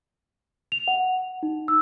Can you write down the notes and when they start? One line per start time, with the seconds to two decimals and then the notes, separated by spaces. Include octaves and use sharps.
0.72 F7
0.88 F#5
1.43 D#4
1.68 E6